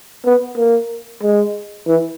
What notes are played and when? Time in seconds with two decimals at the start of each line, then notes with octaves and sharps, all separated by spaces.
0.25 B3
0.57 A#3
1.23 G#3
1.87 E3